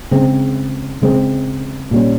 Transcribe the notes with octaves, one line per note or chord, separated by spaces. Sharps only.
C#3 G#3 C4
C#3 G#3 C4
A#2 G3 A#3 C#4